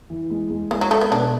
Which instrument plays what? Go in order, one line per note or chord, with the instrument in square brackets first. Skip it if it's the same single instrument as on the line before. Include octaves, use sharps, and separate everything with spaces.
[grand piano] E3
G#3
G#3
[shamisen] E3 [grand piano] G#3
[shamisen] F#3
[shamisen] A3 [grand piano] A4
[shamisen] B3
[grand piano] B2 [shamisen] D4